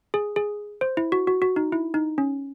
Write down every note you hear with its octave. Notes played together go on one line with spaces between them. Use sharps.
G#4
G#4
C5
E4
F#4
F#4
F#4
D#4
E4
D#4
C#4